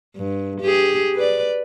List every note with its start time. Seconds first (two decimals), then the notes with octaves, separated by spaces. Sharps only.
0.16 G2
0.61 G4 G#4
1.15 B4 D5